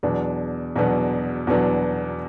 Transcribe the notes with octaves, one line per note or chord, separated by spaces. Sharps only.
E2 B2 F#3 B3 D4
E2 B2 F#3 B3 D4
E2 B2 F#3 B3 D4